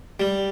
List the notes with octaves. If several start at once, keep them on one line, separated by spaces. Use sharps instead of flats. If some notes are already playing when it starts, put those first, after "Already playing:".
G3